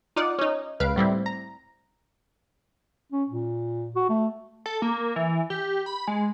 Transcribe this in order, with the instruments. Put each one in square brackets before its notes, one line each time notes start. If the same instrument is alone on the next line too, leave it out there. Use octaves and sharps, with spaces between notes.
[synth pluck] D#4 F4 D5 F#5
C#4 D#4
C#2 B4 F5 D7
A2 G3 C4 E4
A#5
[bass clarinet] C#4
A#2
F#4
A3
[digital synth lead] A4
A#3
E3
G4
B5
G#3